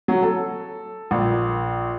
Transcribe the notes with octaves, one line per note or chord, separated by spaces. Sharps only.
F#3
A4
A#1